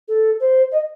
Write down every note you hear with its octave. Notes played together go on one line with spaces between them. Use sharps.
A4
C5
D#5